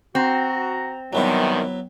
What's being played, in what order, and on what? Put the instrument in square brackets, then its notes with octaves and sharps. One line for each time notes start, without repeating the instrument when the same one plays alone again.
[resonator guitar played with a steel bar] C4 [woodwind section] F#4 A#5
[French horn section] F#2 C3 D#3 [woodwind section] E3 G3 [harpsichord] F#3 B3 E4